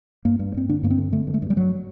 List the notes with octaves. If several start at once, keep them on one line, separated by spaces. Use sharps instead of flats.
G2 A#3
G2
G2 C4
D3 D4
G2 A#3
C4
D3
D3 A3
G2
A3
G2
G3
G2 F#3